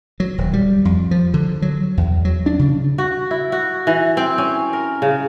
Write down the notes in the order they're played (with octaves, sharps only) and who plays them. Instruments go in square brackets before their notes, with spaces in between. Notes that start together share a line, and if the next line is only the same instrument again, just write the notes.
[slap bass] F#3
D#1
G3
F2
F3
D3
F#3
E2
F#3
D4
C#3
[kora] F#4
E4
F#4
E3
C4
C#4
A#4
C#3